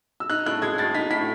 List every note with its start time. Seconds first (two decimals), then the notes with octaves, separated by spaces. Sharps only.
0.20 E6
0.30 D#4 F#6
0.46 A2 F#6
0.62 G#3 G#6
0.78 A2 A6
0.94 D#4 B6
1.10 A2 B6